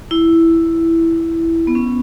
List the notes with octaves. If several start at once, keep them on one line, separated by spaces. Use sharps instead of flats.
E4
B3
C#4